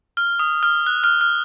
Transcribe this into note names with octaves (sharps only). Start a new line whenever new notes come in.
F6
D#6
F6
F#6
F6
F6